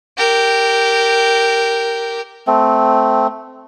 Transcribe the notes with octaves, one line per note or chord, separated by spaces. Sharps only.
G4 A#4
A3 C4